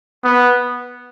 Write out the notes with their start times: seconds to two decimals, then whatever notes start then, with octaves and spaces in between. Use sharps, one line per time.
0.24 B3